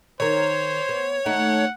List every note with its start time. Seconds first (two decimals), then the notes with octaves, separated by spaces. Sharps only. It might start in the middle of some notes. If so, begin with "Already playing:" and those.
0.20 D#3 A#4 C5 C#5
0.89 B3
1.26 D#2 A3 D#4 F#5